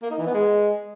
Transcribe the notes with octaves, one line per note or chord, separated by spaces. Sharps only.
A#3
D#4
E3
B3
G#3